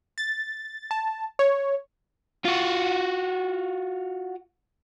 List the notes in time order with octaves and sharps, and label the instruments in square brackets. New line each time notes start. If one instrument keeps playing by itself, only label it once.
[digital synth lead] A6
A5
C#5
[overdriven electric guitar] F4 F#4